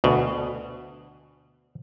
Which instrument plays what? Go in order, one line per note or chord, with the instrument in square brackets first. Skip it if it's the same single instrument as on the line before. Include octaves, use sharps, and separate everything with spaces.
[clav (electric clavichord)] D2 B2